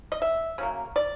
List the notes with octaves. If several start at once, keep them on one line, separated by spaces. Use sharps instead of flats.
D#5
E5
C#3 F#3 A#3
D5